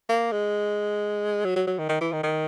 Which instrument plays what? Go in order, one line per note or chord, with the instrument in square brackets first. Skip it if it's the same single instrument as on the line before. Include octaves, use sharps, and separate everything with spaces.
[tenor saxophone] A#3
G#3
F#3
F#3
F#3
D#3
D#3
E3
D#3
D#3